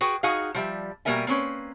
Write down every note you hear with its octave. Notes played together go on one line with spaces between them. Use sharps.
F#4 G#4 B4 G5
D#4 F#4 G#4 D#5 F5
F3 G3 E5
B2 G3 A#3 A#4 E5 G#5
A#3 C4 C#4 B4